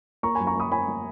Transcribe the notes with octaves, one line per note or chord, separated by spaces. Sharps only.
A#3 A#5 C#6
F#2 G#5 B5
A#5 C#6
A#3 B5 D#6
A#3 G#5 B5
A#3